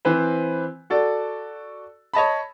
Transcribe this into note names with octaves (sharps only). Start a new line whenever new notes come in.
E3 C4 B4 C5
F#4 A4 D5
C#5 D#5 A5 B5